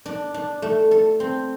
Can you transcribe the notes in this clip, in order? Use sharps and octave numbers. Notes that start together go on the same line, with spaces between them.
D4
D4
A3
A4
C4